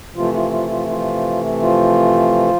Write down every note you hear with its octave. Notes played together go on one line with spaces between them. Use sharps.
C3 E3 F3 A3 F4
F3 F4
F3 F4
F3 F4
F3 F4
F3 F4